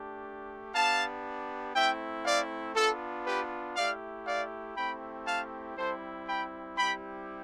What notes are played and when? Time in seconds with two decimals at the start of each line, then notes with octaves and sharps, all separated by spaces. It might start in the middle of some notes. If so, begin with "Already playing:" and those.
Already playing: A3 D4 G4
0.74 B3 D4 G4 F5 A5
1.74 A3 C4 E4 E5 G5
2.25 D5 F5
2.75 B3 D4 F4 A4
3.26 G4 B4
3.76 A3 E4 G4 D5 F5
4.26 D5 F5
4.77 A3 C4 E4 G4 G5 B5
5.27 F5 A5
5.77 G3 C4 E4 A4 C5
6.28 G5 B5
6.78 G3 C4 E4 G4 G5 B5